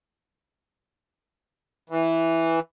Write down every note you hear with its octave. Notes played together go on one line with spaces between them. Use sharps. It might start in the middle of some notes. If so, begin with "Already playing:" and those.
E3